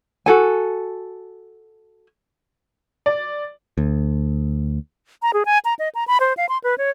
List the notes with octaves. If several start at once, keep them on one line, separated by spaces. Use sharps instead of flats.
F#4 A4 G#5
D5
D2
A#5
G#4
G#5
A#5
D#5
A#5
B5
C5
F5
C6
B4
C#5